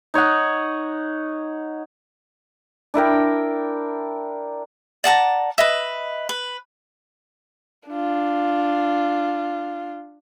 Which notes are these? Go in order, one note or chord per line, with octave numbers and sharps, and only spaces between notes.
D#4 C#5 D#5 F#5
D4 E4 A#4 G5
D5 F#5 A5 A#5
B4 D#5 E5
B4
D4 F4